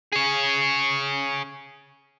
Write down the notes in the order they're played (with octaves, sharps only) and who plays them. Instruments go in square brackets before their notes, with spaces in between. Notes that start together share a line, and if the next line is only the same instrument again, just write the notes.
[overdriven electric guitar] G#4 C#5